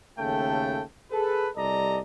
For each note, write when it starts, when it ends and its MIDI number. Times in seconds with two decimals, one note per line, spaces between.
0.18 0.82 39
0.18 0.82 49
0.18 0.82 57
0.18 0.82 69
0.18 0.82 79
1.11 1.49 68
1.11 1.49 69
1.11 1.49 71
1.56 2.00 36
1.56 2.00 55
1.56 2.00 69
1.56 2.00 74
1.56 2.00 75
1.56 2.00 82